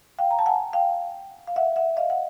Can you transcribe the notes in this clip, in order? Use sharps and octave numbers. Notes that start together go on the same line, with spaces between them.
F5 G5
A#5
A5
F#5 G#5
F5 G5
F5
E5 F#5
E5 F#5
D#5 F5
F#5